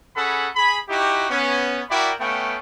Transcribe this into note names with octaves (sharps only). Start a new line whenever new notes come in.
C#4 G#4 A4 F#5 B5
G#4 B5
D#4 E4 F#4 G4
B3 C#4
E4 F#4 A#4 D5 G5 B5
A3 B3 C#4 F5 G5